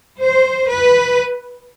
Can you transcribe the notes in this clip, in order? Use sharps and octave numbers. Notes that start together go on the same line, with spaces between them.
C5
B4